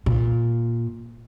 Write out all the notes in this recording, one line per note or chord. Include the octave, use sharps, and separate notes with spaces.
A#2